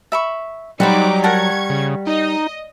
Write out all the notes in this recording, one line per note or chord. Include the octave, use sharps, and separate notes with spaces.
E5 B5 C#6
F#3 G3 D#4 F#4 C5 B5 D6
A#4 F#5 A5 C#6 G#6
C#3
D#4 D#5